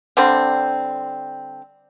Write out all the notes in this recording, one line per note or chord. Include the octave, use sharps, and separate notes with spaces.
D3 G3 C4